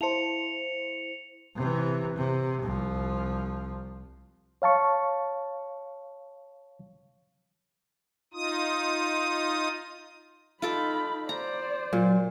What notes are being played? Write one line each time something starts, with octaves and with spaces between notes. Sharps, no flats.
E4 C5 F5 A5 C#7 F7
C3 E3
C3
C2 F3
C#5 F5 A5 C#6
D#4 F4 D#6
D#4 F4 A4 B5 D6
C5 D5 A#5
A#2 F#3